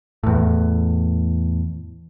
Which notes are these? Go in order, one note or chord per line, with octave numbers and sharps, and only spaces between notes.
E2 A2